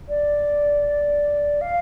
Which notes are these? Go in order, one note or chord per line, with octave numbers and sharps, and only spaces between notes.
D5
F5